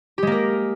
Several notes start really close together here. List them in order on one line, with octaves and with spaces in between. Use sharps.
G4 G#3 A#3 A#4